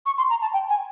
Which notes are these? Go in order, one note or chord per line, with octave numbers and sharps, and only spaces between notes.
C#6
C6
A#5
A5
G5
G#5